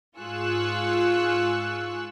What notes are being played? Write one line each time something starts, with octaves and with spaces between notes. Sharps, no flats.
G#2 F4 G#4 C#6 E6 F#6